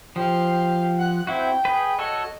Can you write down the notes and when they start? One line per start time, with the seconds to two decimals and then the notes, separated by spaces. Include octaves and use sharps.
0.16 F3 G4 F5
0.98 F#5 F#6
1.27 C4 E4 F#4 G5
1.65 G#4 B4
1.99 F#4 A4 C#5 D#5